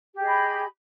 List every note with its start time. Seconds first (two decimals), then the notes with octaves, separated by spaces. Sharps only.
0.14 G4
0.18 G#4
0.22 D#5
0.27 B5